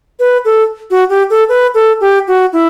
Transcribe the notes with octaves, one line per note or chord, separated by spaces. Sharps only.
B4
A4
F#4
G4
A4
B4
A4
G4
F#4
E4